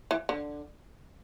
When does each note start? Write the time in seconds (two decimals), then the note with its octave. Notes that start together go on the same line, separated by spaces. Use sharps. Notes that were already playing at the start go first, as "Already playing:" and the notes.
0.11 E3
0.29 D3